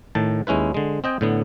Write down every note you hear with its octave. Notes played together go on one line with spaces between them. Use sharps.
A2 D#3 A5
D#2 G#3 C#4 E4 B4
D3 G#3
C4 D#5 G5 G#5
A2 D3 B3